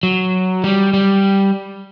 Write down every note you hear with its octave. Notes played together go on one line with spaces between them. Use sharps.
F#3
G3
G3